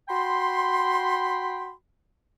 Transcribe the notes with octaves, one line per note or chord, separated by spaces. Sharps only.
F#4 G5 B5 C6